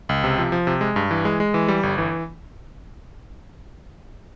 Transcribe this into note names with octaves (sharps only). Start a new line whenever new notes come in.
C#2
C3
F3
F3
C3
G#3
G2
E3
G#3
G#3
E3
G3
G1
E3